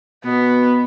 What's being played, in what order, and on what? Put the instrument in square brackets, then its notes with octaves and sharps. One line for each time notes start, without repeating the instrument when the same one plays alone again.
[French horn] B2 [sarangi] B3